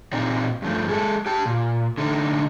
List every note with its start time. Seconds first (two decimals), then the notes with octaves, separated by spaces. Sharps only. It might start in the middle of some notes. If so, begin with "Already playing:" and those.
0.12 A#2 C4 D#4
0.62 G2 F3 A3
0.89 G#3 A4
1.26 G4 A5
1.46 A#2
1.98 D3 A3 D#4